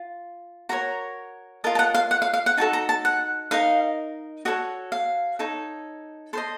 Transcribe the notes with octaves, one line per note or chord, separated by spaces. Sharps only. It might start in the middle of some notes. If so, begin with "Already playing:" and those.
Already playing: F4
F#4 A#4 C#5 A#5
F4 A#4 D#5 A5
A5
F#5
F5
F#5
F5
F5
F#5
D#4 F#4 A4 A5
A#5
A5
F#5
D#4 A#4 D#5 F5
F#4 A4 C#5 D#5
F5
D#4 A4 C#5
A4 C5 D#5 C6